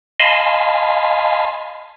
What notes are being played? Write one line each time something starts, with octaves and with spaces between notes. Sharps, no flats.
D#5 F5 G#5 A5 B5 C6